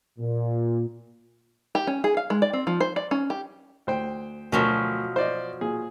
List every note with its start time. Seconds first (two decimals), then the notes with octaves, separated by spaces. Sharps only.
0.19 A#2
1.75 G4
1.87 C#4
2.04 G#4
2.17 F5
2.30 G#3
2.42 D5
2.53 C4
2.67 F3
2.80 C5
2.96 D5
3.11 C#4
3.30 G4
3.87 D2 C5 G5
4.52 D2 B2 F3 F#3 A#4
5.16 C5 D5 D#5
5.61 A#2 G#4